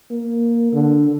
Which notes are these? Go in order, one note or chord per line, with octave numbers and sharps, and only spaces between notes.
A#3
D3